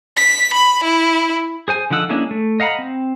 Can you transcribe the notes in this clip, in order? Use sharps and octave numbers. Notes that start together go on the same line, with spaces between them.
B6
B5
E4
G#4 C5 G#5
D3 F3 D#4 F#5 E6
G#3 A#3 C#4 D4 E4
A3
D#5 F5 F#5 A#5 B5
C4